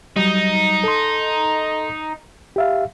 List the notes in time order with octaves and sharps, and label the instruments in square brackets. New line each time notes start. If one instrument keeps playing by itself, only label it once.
[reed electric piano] F#3 G3 [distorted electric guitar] D#4
[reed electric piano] A4 C6
G4 E5 F5